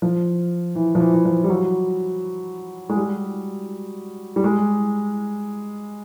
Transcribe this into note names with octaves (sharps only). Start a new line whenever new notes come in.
F3
E3
F3
E3
E3
F3
G3
F#3
G#3
G3
G3
G#3